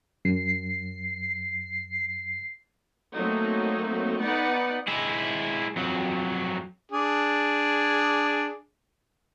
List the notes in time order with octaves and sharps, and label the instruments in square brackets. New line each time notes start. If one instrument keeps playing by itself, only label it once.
[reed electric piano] F#2 [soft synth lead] C7
[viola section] F#3 A3 A#3 C4 D#4
B3 D#4 B4 D5 F#5
[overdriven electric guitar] G#3 E4
F2 F#3
[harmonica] D4 G#4